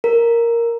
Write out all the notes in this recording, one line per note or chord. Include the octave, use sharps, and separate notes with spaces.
A#4